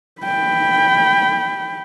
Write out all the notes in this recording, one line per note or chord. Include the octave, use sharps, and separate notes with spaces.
G5 B5